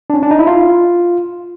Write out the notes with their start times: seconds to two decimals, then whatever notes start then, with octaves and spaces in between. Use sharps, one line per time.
0.10 D4
0.14 C#4
0.23 D4
0.31 D#4
0.39 E4
0.47 F4